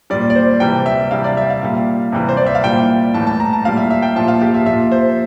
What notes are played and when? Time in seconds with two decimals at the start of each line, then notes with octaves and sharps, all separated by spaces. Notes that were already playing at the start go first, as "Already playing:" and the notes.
0.10 A#2 G3 D5
0.30 D5
0.35 C5
0.60 C3 E3 G3 G5
0.86 E5
1.11 C3 G3 F5
1.24 D5
1.37 E5
1.50 F5
1.62 A#2 G3
2.12 C3 E3 G3
2.29 C5
2.37 D5
2.46 E5
2.55 F5
2.64 A#2 G3 G5
3.14 A2 E3 G3 A5
3.27 A5
3.40 A#5
3.53 A5
3.65 A#2 G3 F5
3.77 E5
3.90 E5
4.02 G5
4.16 A#2 F3 A5
4.28 F5
4.42 G4
4.54 E5
4.66 A#2 F3 E5
4.92 C5